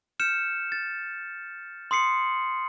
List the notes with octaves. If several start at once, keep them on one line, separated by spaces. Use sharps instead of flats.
F6 G6 C#7 E7
A6
C6 D#6 C7 C#7 F#7